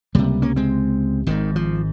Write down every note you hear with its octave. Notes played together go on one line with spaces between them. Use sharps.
C#2 C3 G3 A#3
A#3 C#4
G#3 C4
G#1 G#2 D#3
F3